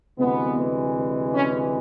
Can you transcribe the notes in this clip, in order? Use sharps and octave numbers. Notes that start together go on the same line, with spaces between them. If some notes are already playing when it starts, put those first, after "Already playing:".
D2 C3 E3 G#3 B3
C#4